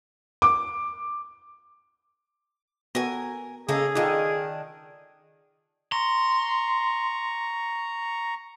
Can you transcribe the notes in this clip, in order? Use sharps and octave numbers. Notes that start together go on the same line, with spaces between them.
D6
B3 F#4 A4 A#4 G#5
C#3 A#3 D#4 G#4 A4
D#3 D4 D#4 F4 A4
A#5 C6 C#6